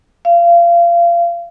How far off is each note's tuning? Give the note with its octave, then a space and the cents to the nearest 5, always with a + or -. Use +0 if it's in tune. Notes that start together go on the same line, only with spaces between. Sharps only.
F5 -30